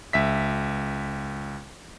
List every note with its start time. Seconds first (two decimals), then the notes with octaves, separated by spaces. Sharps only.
0.13 C#2 E5 B6